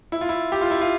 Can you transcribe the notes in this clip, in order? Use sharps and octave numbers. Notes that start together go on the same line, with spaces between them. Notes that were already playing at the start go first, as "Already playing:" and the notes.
E4
F4
E4
G4
F4
E4
F4